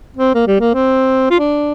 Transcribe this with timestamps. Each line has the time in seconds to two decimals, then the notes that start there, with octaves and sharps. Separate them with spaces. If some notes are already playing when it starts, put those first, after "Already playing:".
0.17 C4
0.34 A#3
0.47 G3
0.60 A#3
0.74 C4
1.30 F4
1.39 D4